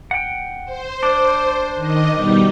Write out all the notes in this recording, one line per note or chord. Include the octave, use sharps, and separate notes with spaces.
F#5 G5
C5
D4
D#3 D#5
B2 G3 D#4